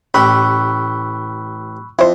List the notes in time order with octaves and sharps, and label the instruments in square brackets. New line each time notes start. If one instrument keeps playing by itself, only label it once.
[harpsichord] A1 G4 [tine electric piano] B5 [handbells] C#6 E6 F#6
[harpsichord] F2 [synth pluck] E4 C5